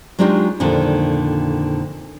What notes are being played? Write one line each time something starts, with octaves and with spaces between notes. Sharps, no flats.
F#3 G#3 D4 D#4 F4 G4
F2 A#2 D3 D#3